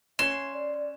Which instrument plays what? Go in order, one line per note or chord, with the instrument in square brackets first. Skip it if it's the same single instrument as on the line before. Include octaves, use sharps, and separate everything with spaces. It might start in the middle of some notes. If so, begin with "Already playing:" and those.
[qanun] C#4 [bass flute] E5 [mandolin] C6 [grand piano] E7
[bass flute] D5